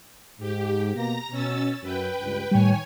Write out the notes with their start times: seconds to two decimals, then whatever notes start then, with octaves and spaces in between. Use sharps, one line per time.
0.40 G#2 G4
0.95 B2 A#3 A#5 A#6
1.31 B2 C#4 E6 A6
1.82 F#2 B4 G5
2.21 C#2 G2
2.51 A2 D#3 G3 C#5 G5 G#5